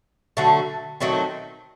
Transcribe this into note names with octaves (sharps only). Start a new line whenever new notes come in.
D3 F#3 A3
D#3 F#3 A3 C4